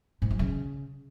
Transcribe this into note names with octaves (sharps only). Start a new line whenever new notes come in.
G#2
F#3
C#3